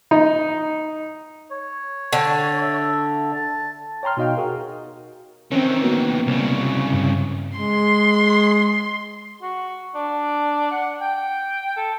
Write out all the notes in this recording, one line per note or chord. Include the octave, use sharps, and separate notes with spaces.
D#4
C#5
D3
E5
A5
C#5 G5 A#5 C6 F6
B2 D#4 F#4 D#5 F5 G5
F#4 G#4 A#4
D#3 E3 C4 C#4
A#3 B3 F#4
C2 C#3
G2
G#3 C6
F#4
D4
F#5
G5
A4